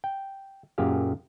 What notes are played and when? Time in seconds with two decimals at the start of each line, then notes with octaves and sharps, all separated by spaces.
0.04 G5
0.78 F#2 A#2 G4 G#4 F5